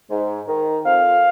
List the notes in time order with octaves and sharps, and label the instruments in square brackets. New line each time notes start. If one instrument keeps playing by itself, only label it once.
[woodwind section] G#2
D#3
F2 F5